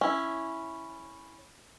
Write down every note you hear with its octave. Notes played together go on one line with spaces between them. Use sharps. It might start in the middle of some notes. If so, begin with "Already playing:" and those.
C#4 E4